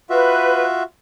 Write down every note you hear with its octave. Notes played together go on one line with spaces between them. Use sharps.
F4 F#4 B4 E5